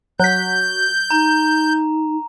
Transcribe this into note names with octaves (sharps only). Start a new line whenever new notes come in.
F#3 F#4 G6 B6
D#4 A#5